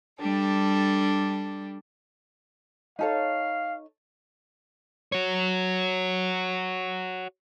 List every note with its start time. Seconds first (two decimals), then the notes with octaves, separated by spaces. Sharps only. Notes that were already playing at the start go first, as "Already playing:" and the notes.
0.20 G3 D4 A4
2.99 D#4 A4 C#5 F5
5.12 F#4 C#5